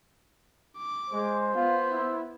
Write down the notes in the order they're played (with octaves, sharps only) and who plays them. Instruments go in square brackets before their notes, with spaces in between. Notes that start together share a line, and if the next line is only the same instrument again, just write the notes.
[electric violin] D6
[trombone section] G#3 [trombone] C5
[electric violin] B3 [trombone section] F4
[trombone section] E4